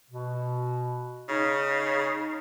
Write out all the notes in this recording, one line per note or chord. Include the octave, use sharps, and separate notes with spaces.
B2
C#3 D#4